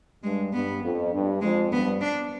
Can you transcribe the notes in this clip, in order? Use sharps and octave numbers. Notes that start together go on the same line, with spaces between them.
G2 G#3
G2 B3
F2
G2
F2 G#3
G2 B3
D4